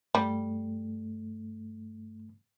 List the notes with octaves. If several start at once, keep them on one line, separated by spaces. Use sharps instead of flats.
G2 G3 A3